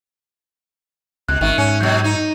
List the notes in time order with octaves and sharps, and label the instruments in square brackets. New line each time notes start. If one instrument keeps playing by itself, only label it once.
[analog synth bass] C#2 [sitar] B2 [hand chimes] F#6
[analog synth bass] G#1 [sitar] D#3 [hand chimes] C#4 E5 F#6
[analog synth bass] G#2 [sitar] C#4 [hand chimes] C#7
[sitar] B2 F#3 [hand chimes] G6
[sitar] D#4